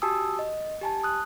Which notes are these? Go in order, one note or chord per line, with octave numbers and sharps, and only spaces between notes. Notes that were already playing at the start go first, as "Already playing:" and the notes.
F#4 G4 G#5 A5 D#6 E6
D#5
G4 G#5 A5
D#6 F#6